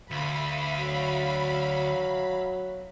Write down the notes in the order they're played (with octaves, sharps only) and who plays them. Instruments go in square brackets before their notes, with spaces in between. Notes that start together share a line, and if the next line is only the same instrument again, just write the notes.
[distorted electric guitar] D2 [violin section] E5 F5 B5
[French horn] F#3